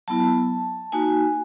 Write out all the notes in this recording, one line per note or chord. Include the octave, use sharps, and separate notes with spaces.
F#3 B3 E4 A5
A#3 D#4 F#4 G#5